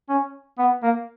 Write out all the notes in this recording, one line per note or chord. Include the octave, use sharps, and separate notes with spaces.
C#4
B3
A#3